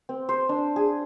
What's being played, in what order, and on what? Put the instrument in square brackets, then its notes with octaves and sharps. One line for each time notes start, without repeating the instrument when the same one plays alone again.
[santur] C4
C5
D4
G#4